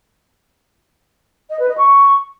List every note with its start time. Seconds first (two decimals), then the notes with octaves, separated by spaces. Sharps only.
1.50 D#5
1.59 B4
1.68 D#5
1.78 C#6